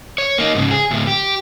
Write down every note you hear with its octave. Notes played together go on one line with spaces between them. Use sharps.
C#5
A#3 D#4
G#2 C#3
G#4
D2 A2
G4